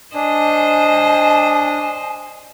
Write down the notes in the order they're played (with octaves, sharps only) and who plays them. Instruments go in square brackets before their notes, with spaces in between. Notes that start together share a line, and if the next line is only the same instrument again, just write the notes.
[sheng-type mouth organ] D4 [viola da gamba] C5 D#5 [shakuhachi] G#5